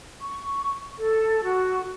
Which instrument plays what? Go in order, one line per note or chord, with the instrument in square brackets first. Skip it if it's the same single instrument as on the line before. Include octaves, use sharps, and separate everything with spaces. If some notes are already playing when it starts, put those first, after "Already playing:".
[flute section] C#6
A4
F#4